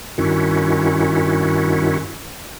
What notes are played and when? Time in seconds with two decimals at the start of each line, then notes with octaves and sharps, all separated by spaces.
0.18 G2 D#3 C#4 E4 F#4